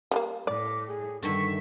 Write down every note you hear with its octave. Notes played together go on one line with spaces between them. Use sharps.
G3 A3 A#3
A2 D5 D6
G#4
G2 D3 D#3 A3 E5 C#6